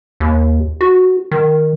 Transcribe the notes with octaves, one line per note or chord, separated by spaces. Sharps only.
D#2
F#4
D#3